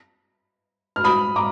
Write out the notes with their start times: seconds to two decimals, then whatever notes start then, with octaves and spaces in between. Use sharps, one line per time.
0.96 F6
1.04 B5 D#6
1.36 A#5 D6